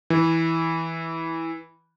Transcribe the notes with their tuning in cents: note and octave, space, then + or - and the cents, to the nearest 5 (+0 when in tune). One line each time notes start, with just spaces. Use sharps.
E3 -10